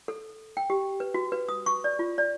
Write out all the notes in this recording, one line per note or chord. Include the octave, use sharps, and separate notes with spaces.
A4
G5
G4
B4
F#4
B4
D#6
C#6
D5
F4
D5